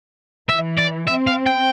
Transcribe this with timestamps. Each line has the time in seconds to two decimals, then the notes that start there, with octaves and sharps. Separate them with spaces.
0.49 E3 E5
0.79 D5
1.08 C4 E5
1.27 F5
1.46 G5